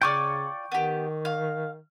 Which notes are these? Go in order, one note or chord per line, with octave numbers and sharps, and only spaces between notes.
C#3 F4 C#5 D5 G5 C#6 D6
D#3 B3 G4
F5